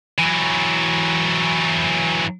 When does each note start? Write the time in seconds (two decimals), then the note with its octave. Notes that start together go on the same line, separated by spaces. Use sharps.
0.18 E3 F#3